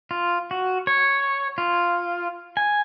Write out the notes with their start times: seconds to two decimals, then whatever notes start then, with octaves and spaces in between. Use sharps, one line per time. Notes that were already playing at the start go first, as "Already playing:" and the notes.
0.11 F4
0.51 F#4
0.87 C#5
1.58 F4
2.57 G#5